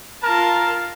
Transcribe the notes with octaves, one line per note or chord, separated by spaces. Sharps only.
F4 A#4 A5